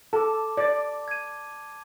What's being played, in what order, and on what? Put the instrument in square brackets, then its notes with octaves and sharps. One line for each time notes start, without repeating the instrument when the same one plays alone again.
[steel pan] A4 [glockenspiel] A5 D6
[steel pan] D5
[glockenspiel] G#6 D#7